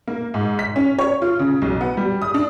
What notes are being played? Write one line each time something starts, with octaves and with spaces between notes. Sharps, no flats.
A#3
G#2
B6
C#4
C#5
F4
C#3
B1
B3
G3
D#6
D4